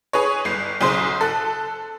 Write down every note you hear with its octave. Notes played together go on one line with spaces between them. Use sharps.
G#4 B4 C#5
G1 C7
B1 C#3 C5
A4 F#6